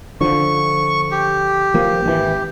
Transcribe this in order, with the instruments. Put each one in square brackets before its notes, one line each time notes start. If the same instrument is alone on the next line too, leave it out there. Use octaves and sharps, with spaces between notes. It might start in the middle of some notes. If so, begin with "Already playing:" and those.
[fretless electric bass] D3 F3 [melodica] C#6
[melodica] G4
[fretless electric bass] F3 A#3
G#1 D3 E3